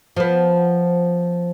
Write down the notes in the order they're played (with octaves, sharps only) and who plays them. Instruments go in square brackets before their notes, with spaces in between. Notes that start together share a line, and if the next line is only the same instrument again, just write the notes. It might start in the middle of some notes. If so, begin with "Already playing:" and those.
[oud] F3 B3